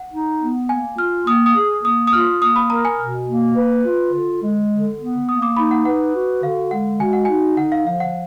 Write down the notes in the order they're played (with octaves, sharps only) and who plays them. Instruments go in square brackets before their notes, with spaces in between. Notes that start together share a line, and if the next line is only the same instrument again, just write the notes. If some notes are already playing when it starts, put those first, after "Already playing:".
Already playing: [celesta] F#5
[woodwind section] D#4
B3
[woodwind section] A#3 [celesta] G#5
[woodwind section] F4 [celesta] F6
[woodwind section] A#3 [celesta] D#6
[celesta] D#6
[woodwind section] G#4
[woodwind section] A#3 [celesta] D#6
[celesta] D#6
[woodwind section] F4 [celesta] F6
[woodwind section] A#3 [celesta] D#6
[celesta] B5
[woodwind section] A#4 [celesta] A#5
[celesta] G#5
[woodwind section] B2
A#3
B4
F4
D3
G#3
D3
B3
[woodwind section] A#3 [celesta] D#6
[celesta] D6
[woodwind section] D#4 [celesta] B5
[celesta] F#5
[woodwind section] B4 [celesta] F#5
[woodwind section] F#4
[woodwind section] D3 [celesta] F5
[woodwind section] G#3 [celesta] F#5
[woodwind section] F#4 [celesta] G#5
[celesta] F#5
[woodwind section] D#4 [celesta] G#5
[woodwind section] D3 [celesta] F#5
[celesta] F5
[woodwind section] F3 [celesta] F5
[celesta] F#5